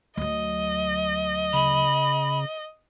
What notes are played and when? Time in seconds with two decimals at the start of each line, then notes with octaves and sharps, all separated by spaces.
0.17 D2 F#3 D#5
1.53 C#3 B5